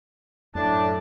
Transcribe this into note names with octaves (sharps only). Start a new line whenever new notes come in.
F#2 A2 D4 A5